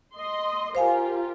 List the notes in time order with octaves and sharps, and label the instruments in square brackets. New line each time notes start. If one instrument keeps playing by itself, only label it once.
[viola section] D#5 C6
[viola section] F4 G4 A#4 [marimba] C5 F5 G#5